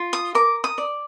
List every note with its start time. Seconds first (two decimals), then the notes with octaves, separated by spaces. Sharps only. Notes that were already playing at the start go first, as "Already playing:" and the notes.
Already playing: F4
0.13 D#6
0.35 A#4 D6
0.64 D#6
0.78 D5